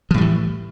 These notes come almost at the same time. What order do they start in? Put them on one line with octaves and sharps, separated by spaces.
F3 A2 G3 E3